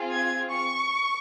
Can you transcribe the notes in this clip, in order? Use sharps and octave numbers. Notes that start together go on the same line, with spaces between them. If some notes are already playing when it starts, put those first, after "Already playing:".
Already playing: C4 F4 G#4
G#6
C#6